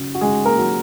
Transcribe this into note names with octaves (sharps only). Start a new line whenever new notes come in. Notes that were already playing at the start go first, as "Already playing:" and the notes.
Already playing: C#3 F#3
F#4
C#3 G#3 G#4
A#3 A#4
F#3